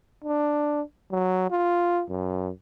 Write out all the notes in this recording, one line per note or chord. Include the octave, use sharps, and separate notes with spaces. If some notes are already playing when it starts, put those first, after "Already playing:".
D4
F#3
F4
F#2